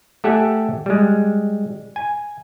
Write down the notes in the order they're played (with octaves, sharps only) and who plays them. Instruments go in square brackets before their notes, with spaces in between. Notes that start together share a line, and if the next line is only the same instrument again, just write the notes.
[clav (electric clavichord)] A3 G4 A4 E5 F#5 G#5
G3 G#3
G#5